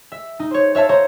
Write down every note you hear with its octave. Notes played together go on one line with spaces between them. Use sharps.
E5
D#4
C5 C#5
C#5 E5 F5 A5
C5 C#5 A#5